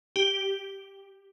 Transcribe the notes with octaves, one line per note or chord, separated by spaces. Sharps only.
G4